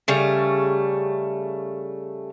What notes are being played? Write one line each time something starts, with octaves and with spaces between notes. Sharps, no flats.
C#3 G3 A3